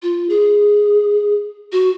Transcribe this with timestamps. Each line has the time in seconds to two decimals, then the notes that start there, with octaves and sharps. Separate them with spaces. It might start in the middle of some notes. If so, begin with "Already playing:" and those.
0.03 F4
0.29 G#4
1.72 F#4